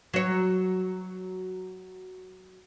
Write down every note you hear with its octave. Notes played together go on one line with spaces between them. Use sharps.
F#3 C#5